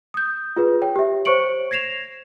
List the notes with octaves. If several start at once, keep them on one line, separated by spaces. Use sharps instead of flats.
D#6 G6
F4 G#4 B4
C#5 G5
G4 E5
C5 C#5 C#6 C#7 D7 F#7
G#6 A#6 C7 E7 F7